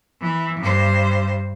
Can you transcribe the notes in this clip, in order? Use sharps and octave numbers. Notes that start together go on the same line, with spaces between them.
E3
G2 C5